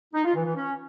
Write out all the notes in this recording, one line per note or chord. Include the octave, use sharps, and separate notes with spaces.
D#4
F4
E3
E3
C#4